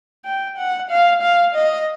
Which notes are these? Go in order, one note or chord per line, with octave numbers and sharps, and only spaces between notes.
G5
F#5
F5
F5
D#5